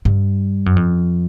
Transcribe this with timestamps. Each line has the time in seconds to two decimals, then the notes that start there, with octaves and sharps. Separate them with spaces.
0.05 G2
0.66 F#2
0.76 F2